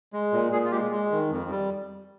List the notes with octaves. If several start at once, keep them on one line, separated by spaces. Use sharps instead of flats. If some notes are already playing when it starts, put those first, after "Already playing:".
G#3
A#2
A#2 G#4
F4
G#3 G4
G#3
D#3
F2
G3